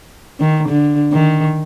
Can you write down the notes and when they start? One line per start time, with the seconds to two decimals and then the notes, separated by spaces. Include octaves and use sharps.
0.40 D#3
0.69 D3
1.12 D#3